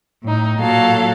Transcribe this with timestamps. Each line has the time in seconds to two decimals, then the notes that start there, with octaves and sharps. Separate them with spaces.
0.24 A2 D#4
0.58 A#2 F#3 A4 F5